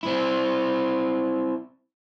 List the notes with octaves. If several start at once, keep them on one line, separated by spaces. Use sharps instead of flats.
C4 E4